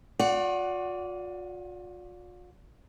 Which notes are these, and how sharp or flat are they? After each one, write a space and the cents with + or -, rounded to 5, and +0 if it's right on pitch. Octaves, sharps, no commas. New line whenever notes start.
F4 +45 D5 -25 F#5 +5